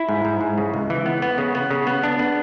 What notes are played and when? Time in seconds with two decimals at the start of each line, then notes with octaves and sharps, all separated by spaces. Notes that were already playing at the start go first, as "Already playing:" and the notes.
Already playing: E4
0.09 G#2
0.25 G#2
0.41 G#2
0.58 C#3
0.74 C#2
0.90 E3
1.06 B3
1.22 B3
1.38 C#3
1.55 B3
1.70 C#3
1.87 B3
2.04 D4
2.19 B3